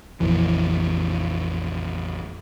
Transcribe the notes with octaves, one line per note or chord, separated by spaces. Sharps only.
A#1 F2 E3